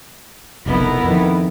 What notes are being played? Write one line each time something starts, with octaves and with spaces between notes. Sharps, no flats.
F1 B1 B2 B3 E4 A#4
F2 D#3